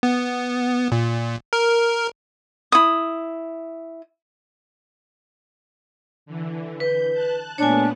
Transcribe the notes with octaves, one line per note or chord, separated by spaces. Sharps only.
B3
A#2
A#4
E4 D#6
D3 E3
B4 G6
A5 F#6
A#2 A3 B3 D4 C#5 G#5